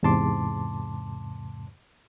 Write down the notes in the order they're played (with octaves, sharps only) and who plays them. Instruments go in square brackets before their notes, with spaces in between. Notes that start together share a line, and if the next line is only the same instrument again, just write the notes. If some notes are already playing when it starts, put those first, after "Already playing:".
[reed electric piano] E2 G#2 C3 A5 C6 D6